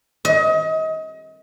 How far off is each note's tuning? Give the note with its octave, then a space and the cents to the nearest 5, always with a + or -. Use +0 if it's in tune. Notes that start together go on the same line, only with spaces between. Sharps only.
D#5 +30